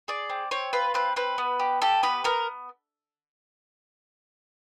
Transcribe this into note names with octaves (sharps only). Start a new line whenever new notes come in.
G#4 D5
C4
C4 C#5
F4 B4
C4 B4
C4 B4
B3
G4
G4 A4
B3 B4
B3 A#4